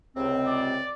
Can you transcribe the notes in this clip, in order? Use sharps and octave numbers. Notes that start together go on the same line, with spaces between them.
C#2 C3 C4
D5